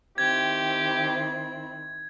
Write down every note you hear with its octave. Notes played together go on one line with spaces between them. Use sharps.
D#3 C4 E4 G4 G#6